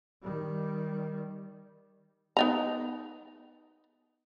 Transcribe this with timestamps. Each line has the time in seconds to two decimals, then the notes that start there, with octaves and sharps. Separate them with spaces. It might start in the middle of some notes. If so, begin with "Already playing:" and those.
0.22 D#3 G3
2.37 B3 D#4 A#5